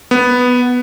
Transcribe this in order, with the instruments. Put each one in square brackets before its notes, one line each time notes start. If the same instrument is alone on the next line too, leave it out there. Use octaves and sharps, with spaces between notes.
[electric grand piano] B3